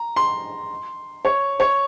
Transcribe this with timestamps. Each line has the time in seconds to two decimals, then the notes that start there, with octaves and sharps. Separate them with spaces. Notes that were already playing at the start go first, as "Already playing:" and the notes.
Already playing: A#5
0.16 C6
1.25 C#5
1.60 C#5